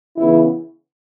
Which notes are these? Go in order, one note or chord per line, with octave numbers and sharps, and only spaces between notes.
C#3 E3 B3 E4